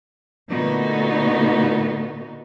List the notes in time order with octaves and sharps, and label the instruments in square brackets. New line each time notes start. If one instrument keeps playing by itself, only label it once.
[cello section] A#2 D3 A3 B3 D#4 F#4